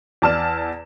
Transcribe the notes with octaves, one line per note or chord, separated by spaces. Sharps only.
E2 D5 A5 E6 F6 E7